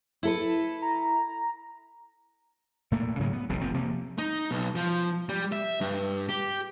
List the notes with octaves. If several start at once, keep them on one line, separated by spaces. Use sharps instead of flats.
E4 A4 B4
A#5
A#2 A3 A#3
G#2 C#3 F#3 A#3
B3
E1 B1 C3
F1 A#2 F3 C4
C3 F3 A#3
D#4
B1
F3
G3
E5
G2
G4